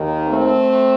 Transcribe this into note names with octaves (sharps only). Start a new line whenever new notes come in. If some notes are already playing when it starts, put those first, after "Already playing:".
Already playing: D#2 D#3
A3 C4